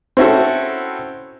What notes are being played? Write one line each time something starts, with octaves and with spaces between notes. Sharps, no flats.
C4 C#4 E4 F#4 A4